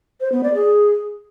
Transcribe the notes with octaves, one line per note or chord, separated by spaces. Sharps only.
C5
B3
D5
G#4